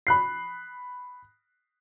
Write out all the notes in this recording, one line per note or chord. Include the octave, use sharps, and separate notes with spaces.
B5 F#6 C7